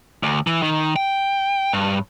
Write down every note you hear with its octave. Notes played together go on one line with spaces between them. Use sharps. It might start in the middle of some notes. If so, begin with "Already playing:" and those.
D2
E3
D#3
G5
G2